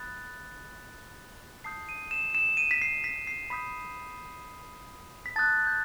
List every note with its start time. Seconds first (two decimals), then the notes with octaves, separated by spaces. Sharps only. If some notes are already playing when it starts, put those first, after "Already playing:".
Already playing: B5 D#6 F#6 A6
1.64 A5 D#6 G6 C7
1.89 D#7
2.11 E7
2.35 E7
2.57 D#7
2.71 B6
2.82 C7
3.04 B6
3.27 C7
3.50 B5 D#6 G6 B6
5.26 B6
5.36 A5 D#6 F#6 A6
5.67 G6